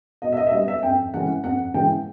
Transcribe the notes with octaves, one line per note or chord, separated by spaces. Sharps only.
B2 D#5
E5
D#5
E5
G3 B3 D#5
E5
F2 G5
C#3 E3 G#3 C#4 F#5
F2 F#5
C#3 E3 G#3 C#4 G5